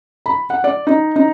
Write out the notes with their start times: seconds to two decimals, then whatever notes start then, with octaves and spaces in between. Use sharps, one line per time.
0.26 B5
0.50 F#5
0.64 D5
0.87 D#4
1.16 D#4